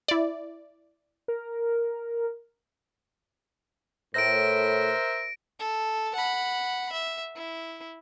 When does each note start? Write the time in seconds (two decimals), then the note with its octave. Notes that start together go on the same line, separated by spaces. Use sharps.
0.08 E4 D5
1.28 A#4
4.14 A2 A#4 C5 E5 A#6 D7
5.60 A4
6.15 F#5 B5
6.92 E5
7.36 E4